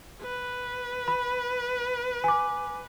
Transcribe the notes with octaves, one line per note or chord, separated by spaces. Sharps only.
B4
B5
G#5 D6